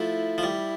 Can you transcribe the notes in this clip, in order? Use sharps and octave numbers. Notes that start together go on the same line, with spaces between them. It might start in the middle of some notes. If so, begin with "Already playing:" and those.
Already playing: F3 A3 E4
F3
G3